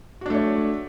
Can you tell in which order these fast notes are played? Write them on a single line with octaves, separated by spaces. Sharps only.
F#4 D4 A3 C#5